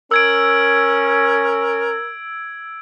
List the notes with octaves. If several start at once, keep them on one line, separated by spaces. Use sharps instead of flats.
C#4 A#4 E6 G#6 D7